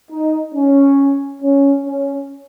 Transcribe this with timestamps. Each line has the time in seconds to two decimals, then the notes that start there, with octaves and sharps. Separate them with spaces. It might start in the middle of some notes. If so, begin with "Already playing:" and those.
0.11 D#4
0.55 C#4
1.42 C#4
1.86 C#4